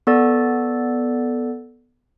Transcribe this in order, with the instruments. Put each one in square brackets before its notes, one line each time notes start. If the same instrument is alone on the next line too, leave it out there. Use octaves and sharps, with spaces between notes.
[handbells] B3 A4 D5